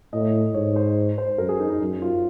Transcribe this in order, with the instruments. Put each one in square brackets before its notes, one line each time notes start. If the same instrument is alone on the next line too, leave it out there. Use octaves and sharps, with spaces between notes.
[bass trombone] A2 [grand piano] D#5
[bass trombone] G#2 [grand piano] C#5
[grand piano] C5
C5
[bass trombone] F#2 [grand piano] A#4
[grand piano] G#4
D#4
D#4
[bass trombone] F#2
[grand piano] F4